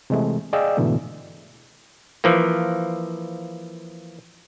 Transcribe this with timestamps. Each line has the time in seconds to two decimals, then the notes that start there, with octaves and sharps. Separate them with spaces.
0.10 C3 E3 G#3 A3
0.53 G#4 D5 D#5 F5 G5 E6
0.77 G#2 B2 D3 E3 A3
2.24 E3 F3 A#3